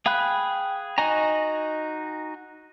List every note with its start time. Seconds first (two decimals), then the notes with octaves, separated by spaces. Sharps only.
0.06 G#4 F5 G5 B5 F#6
0.98 D#4 F#4 D#5 G#5 A#5